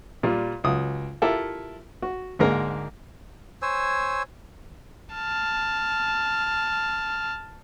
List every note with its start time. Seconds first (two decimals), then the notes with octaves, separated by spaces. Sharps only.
0.23 A#2 G3 F4
0.64 C#2 F#3 D#6
1.22 E4 F4 G4 A4 A#4
2.02 F#4
2.39 D2 G#2 G#3 A#3 A#4
3.62 C5 C#5 G#5 E6
5.14 A5 F6